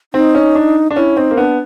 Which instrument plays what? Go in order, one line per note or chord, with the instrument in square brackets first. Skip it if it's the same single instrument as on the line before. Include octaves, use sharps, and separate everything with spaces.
[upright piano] C4 [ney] D#4
[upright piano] C#4
D4
D4
[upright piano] C#4 [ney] E4
[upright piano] C4 [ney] D#4
[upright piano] A#3
[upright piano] B3 [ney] D4